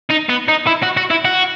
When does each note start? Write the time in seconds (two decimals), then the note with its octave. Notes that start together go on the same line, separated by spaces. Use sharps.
0.10 D#4
0.29 B3
0.48 D#4
0.67 E4
0.83 F#4
0.97 F#4
1.10 E4
1.25 F#4